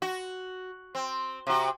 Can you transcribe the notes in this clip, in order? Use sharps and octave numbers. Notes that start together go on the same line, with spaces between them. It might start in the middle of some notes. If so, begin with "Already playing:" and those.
F#4
C4
C3 F#4